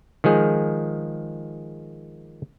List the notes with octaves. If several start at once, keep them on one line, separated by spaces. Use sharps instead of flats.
D#3 F3 G#3 G#4